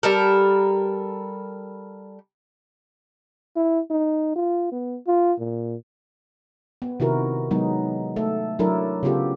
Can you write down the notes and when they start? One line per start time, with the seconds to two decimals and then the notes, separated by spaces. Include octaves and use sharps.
0.03 G3 A4 A#4
3.56 E4
3.91 D#4
4.36 F4
4.72 B3
5.07 F4
5.39 A#2
6.82 B3
7.00 C3 D#3 E4 F#4 A#4
7.51 F#3 G#3 B3 D#4
8.16 A3 A4
8.59 F#3 D4 E4 A4 A#4
9.03 C#3 B3 F4 G4 A4